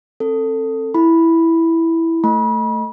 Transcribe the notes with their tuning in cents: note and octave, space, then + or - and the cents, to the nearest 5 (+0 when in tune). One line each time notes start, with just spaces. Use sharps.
C4 +30 A4 +20
E4 +0 B5 +0
A3 +10 B5 -35